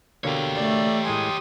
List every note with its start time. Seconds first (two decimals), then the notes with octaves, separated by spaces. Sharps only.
0.24 B2 D3 A#3 G4 C#5
0.55 A3 D5
1.05 A2 G#3 G#5 C6 D#6